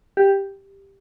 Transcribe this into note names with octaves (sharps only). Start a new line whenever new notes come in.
G4